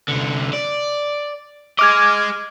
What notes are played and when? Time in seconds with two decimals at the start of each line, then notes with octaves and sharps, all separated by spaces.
0.09 C2 D3
0.53 D5
1.79 G#4 D#5 D6 F6 G#6